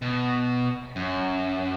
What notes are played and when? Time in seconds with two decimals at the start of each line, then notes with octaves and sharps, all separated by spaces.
0.02 B2
0.96 F#2